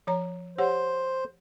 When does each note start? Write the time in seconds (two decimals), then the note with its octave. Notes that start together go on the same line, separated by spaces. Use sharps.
0.07 F3 C#5 A#5
0.58 G4 C5 C#5 F#5